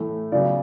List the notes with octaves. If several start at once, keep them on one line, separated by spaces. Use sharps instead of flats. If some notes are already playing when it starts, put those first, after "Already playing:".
Already playing: A2 E3 A3
C#3 F#3 B3 D5